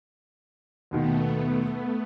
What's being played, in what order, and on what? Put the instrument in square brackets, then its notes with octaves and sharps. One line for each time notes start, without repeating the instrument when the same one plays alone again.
[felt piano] D#2 B2 D#3 [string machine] A3 B3